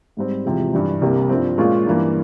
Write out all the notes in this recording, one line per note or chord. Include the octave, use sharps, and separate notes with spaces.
G#2 G3 C4
E2 C3 F3 G#3
G2 E3 G3
C2 C3 G3 A#3
G2 F3 C4
A#2 G#3 C#4 F4
G2 E3 A#3